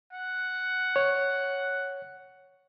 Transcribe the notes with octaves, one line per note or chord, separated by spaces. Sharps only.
F#5
C#5